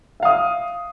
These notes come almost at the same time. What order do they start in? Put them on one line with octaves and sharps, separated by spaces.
E5 F5 D#6